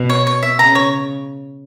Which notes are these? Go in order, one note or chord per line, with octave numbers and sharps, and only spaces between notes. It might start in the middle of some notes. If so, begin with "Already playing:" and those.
Already playing: B2
C#5
C#5
E5
C#3 A#5
C#5